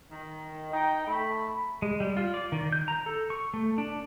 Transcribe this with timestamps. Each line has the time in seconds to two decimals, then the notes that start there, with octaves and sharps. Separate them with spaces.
0.11 D#3
0.72 D#4 G5
1.07 A3 B5
1.82 G#3
2.00 G3
2.17 F4
2.34 D5
2.52 D#3
2.72 G6
2.88 A#5
3.06 A4
3.30 C#6
3.54 A3
3.78 D4